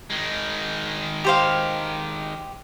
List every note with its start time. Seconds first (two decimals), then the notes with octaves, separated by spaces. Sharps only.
0.10 D#3 G#3
1.24 G4 C5 F5